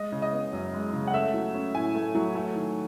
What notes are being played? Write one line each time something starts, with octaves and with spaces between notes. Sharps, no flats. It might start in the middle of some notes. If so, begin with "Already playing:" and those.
Already playing: G#3 D#5
C#3
D#5
B3
F#2
G#3
C#3
F#5
A3 E5
F#3
C#4
A2 G#5
A3
F#3
A3
D#3